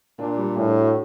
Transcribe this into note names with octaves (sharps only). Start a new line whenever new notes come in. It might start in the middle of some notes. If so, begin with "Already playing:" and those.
A#2 D4
G3
A2 D4
F#4